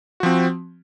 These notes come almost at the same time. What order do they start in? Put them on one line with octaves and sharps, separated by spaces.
F#4 F3 C4